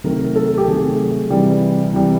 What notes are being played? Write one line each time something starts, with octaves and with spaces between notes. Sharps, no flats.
C3 D#3 F#3 A3 A#4
A4
G4
C3 D#3 F#3 A3 G#4
C3 E3 G3
C3 E3 G3